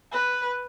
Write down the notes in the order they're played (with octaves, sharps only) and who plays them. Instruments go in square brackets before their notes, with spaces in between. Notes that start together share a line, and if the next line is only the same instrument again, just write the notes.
[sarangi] B4